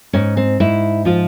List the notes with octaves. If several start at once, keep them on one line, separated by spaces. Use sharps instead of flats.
G#2 C#4
C4
G#2 E4
F3 F4